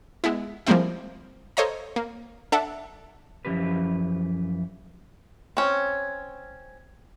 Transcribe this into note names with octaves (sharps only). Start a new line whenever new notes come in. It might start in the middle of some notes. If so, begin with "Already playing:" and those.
G#3 B3 E4
F3 G3 G#3 A#3 C4 E4
A4 C5 C#5 D#5 F5 A#5
A#3
D4 A4 E5 F#5 A5
F#2 E3 F3 C#4 G4 B4
C4 C#4